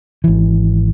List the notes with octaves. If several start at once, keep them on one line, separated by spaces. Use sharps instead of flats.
G#1 E3